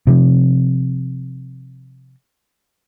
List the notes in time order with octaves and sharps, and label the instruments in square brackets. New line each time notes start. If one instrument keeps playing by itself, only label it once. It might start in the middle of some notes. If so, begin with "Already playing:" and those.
[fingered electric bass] C3 F3